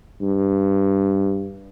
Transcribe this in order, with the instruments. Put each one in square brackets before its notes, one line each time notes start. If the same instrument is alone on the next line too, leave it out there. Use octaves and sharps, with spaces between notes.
[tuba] G2